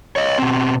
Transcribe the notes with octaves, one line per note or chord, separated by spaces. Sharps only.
C#5 D#5
B2 C4